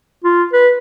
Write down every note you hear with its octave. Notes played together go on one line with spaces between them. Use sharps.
F4
B4